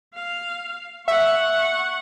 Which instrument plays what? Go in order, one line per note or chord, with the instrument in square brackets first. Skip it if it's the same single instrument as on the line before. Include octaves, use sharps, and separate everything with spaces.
[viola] F5
[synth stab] E5 [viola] F#5 C#6